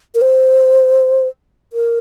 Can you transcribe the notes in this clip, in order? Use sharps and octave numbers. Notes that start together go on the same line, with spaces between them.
A#4
C5
A#4